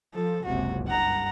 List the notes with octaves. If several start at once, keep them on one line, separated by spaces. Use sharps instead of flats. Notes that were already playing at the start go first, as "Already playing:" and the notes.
F3 A4
F#1 C#2 C3 F#4
G2 F#5 A#5